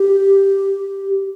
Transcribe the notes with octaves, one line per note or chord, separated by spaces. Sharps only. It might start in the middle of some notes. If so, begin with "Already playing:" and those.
Already playing: G4